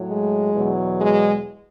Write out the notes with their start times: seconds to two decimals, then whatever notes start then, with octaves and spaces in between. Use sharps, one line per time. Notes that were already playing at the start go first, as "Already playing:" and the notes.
Already playing: A2 F#3
0.08 G#3
0.53 E2 B2 F#3
0.99 G#3